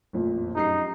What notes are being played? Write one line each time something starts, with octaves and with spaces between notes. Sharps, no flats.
A1 F2 A#2
F#2 D#4 G4 C7